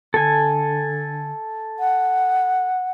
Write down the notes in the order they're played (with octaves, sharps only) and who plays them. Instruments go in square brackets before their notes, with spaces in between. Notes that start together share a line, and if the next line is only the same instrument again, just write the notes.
[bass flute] D3 [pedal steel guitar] A4 G#5
[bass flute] F#5